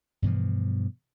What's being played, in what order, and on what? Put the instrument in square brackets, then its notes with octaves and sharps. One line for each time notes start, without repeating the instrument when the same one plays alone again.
[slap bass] G2 B2 E3 F3